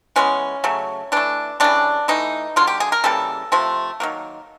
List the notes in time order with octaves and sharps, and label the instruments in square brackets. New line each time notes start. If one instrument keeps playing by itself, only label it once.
[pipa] E3 G#3 B3 C#4
C#3 F#3 A3
E3 A3 D4
C#3 E3 G3 D4
E3 A3 D#4
D3 F#3 A#3 F4
G4
G#4
A#4
C#3 E3 G3 A#3 A4
C3 F3 A3
D#3 F#3 A#3